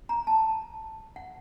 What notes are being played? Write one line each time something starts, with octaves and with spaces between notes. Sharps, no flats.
A#5
A5
F#5